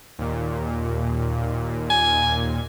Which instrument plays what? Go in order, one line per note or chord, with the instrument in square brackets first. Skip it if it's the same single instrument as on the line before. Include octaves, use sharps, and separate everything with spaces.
[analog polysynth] D#2 A#2
[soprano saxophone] G#5